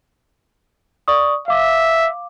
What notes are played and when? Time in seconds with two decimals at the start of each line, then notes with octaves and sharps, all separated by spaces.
1.08 D5 C#6 D#6
1.48 E5 F5 D6